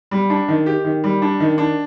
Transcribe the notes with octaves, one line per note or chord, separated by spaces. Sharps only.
G3
D4
D#3
G4
D#3
G3
D4
D#3
D4